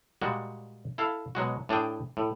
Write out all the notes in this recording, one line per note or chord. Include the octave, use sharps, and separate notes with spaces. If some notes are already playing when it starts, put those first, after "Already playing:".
A#2 G3 G#3 F#4
E4 A4 F5
B2 F#3 G#3 F#4
A2 D4 G#4 G5
A2